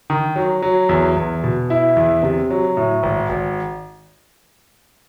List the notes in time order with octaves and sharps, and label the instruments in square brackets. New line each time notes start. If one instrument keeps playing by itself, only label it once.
[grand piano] D#3
F#3
F#3
E2
E2
B2
E4
E2
C3
F#3
A2
G#1
G#1